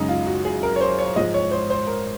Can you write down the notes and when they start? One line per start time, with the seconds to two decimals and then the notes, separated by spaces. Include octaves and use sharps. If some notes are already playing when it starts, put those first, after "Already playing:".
Already playing: F#2 C#3 G#3 D#4
0.09 F4
0.26 F#4
0.45 G#4
0.63 A#4
0.76 C#5
0.81 C5
0.98 C#5
1.16 G#2 F3 G#3 D#5
1.34 C#5
1.51 C5
1.70 C5
1.87 A#4